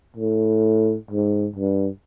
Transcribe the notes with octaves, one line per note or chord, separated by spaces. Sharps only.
A2
G#2
G2